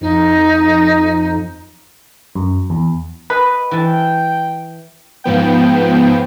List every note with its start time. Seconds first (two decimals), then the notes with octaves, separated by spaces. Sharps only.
0.01 F2 D#4
2.35 F#2
2.70 E2
3.30 B4 D#5
3.71 E3 G5 A5
5.24 G#2 F3 B3 G5